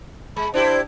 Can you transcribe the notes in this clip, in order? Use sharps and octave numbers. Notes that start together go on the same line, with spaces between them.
G#3 B5
D4 E4 G4 C5